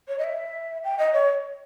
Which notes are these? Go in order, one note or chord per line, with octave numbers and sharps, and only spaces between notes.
C#5
D#5
E5
G5
D#5
C#5